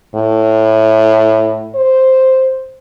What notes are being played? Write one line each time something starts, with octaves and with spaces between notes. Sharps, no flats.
A2
C5